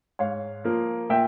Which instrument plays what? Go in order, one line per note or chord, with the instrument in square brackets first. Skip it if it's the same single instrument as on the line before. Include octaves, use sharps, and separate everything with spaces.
[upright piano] G#2 C#5 F5
F3 A#3
A#2 E5 G5